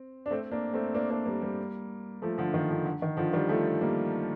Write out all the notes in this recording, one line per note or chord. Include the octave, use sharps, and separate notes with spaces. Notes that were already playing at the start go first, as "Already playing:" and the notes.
Already playing: C4
D4
A3 C4
A#3 D4
A3 C4
A#3 D4
A#3 D4
G3 A#3
G3 A#3
F3 A3
D3 F3
D#3
D3 F3
D3
D#3
D3 F3
D#3 G3
F3 A3
G3 A#3